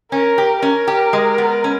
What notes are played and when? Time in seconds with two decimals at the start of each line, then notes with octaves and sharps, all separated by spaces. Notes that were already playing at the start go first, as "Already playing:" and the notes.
0.12 C#4 A#4
0.38 G4
0.62 C#4 A#4
0.88 G4
1.13 G#3
1.38 B3
1.64 C#4